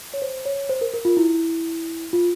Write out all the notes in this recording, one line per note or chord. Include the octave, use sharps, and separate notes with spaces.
C#5
C5
C#5
C5
A#4
A#4
F4
E4
F4